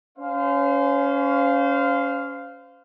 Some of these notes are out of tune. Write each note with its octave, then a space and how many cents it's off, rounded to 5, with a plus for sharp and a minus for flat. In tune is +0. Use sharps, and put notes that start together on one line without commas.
C#4 +15 C5 -30 F5 +0